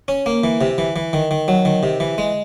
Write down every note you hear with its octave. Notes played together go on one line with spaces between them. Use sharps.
C#4
A#3
E3
C3
E3
E3
D#3
D#3
F#3
D#3
C3
E3
G#3